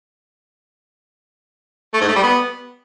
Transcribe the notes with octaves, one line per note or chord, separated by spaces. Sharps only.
A3
G#2
A3
G3
B3